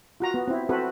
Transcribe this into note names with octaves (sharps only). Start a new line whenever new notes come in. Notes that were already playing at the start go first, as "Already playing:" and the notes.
F4 F#4 A#5
B3
C4 E4
C4 F#4 A4 B4